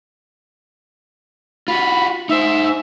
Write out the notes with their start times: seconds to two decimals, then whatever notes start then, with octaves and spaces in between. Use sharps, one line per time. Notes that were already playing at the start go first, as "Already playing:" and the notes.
1.68 F4 F#4 B5
2.29 D#4 C5 E5